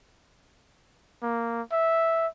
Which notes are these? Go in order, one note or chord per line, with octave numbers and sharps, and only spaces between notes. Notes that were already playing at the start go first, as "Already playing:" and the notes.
A#3
E5